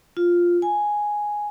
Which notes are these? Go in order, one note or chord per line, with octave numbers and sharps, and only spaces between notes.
F4
G#5